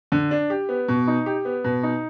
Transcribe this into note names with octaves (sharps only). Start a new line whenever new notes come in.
D3
D4
G4
B3
B2
D#4
G4
B3
B2
D#4